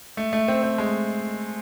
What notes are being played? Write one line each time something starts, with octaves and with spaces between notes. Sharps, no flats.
A3
A3
C4
C4
G#3